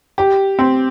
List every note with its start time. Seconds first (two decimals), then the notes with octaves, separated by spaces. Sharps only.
0.18 G4
0.59 C4